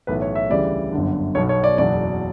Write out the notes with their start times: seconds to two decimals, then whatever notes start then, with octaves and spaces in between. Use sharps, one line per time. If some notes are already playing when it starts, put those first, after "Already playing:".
0.07 B1 A2 E3 B4
0.22 C#5
0.35 E5
0.50 D2 C#3 E3 G3 D5
0.92 G1 F#2 D3
1.35 B1 B2 F#3 C#5
1.49 C#5
1.64 D5
1.78 F#1 E2 B2 F#3 D5